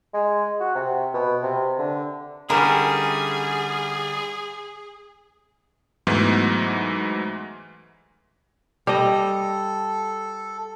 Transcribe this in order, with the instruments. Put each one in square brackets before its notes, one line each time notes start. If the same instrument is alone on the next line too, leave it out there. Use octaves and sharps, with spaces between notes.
[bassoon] G#3
F#4
C3
B2
C3
D3
[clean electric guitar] D3 G3 C#4 [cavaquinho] E4 A#4 [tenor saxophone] G#4
[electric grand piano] G#2 E3 F#3 A3 B3
[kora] G3 D#5 [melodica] A4